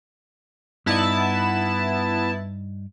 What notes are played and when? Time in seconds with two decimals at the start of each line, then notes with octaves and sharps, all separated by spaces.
0.86 G2 B3 D#4 E4 D5 A5